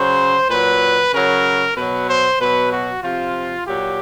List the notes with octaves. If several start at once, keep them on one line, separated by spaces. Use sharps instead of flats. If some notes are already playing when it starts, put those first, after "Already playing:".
Already playing: C#3 F#3 C5
A#2 F#3 B4
C#3 F#3 A#4
B2 F#3 B4
C5
B2 F#3 B4
F#4
C3 F3 F4
A#2 F#3 G4